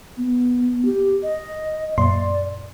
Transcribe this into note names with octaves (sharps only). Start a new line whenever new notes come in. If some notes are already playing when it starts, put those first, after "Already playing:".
B3
G4
D#5
F#2 A#2 D5 C6